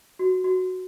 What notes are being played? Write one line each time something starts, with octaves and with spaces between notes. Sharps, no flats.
F#4
F#4